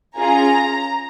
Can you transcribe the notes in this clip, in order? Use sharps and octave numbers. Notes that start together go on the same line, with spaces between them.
C#4 F4 G#4 A#5